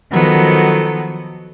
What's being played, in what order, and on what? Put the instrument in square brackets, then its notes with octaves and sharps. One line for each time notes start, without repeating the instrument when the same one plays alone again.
[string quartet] D#3 F3 F#3 B3 A4